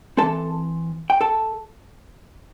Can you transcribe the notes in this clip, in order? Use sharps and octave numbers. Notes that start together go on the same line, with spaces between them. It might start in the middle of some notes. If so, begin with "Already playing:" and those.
E3 A3 C4 A4 A5
G5
A4 A5